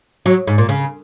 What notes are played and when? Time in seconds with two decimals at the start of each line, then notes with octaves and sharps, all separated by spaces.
0.26 F#3
0.47 G#2
0.58 A#2
0.69 C#3